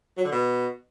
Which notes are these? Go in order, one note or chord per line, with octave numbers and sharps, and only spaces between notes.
F#3
D3
B2